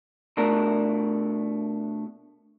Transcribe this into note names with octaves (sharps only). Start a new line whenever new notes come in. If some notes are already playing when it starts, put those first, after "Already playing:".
B2 A3 D4 A#4